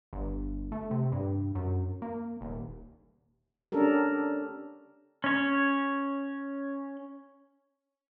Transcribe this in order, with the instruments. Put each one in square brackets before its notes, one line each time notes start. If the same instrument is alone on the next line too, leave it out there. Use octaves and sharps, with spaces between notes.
[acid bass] G1
A3
C3
G2
F#2
A#3
D#1
[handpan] C#4 D4 G4 A4 A#4
[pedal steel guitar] C#4 C#5